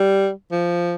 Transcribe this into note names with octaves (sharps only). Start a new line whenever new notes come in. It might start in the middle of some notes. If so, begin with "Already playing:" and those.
Already playing: G3
F3